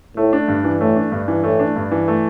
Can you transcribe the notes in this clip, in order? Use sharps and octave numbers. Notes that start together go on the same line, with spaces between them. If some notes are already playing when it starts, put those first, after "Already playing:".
A2 A3
D4
G2
E3
A2 A3
D4
G2
E3
A2 A3
D4
G2
E3
A3